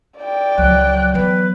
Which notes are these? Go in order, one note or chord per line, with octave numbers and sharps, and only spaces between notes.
D5 G5
C#2 F#3 F#6
E3 B3 B4